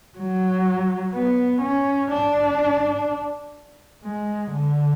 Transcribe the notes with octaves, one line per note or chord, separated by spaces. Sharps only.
F#3
B3
C#4
D4
G#3
D3